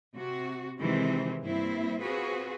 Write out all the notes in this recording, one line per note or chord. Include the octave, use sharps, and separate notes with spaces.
C3 F#4
C3 D#3 E3 G#3 C4
G2 A#3 C4 E4
C4 F4 F#4 G#4 B4